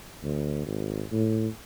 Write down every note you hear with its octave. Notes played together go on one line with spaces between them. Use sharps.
D2
G#1
A2